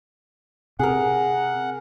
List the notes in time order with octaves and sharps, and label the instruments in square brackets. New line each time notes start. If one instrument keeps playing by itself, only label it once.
[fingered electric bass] C3 [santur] G#4 A#4 [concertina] F#5